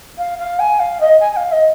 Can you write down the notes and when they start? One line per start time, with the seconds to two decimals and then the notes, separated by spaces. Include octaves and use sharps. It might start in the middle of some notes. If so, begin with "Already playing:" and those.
0.18 F5
0.39 F5
0.60 G#5
0.80 F5
1.01 D#5
1.21 G#5
1.32 G#5
1.37 F5
1.52 D#5